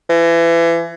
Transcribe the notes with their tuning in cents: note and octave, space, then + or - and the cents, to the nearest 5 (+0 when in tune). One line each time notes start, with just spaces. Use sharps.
E3 +30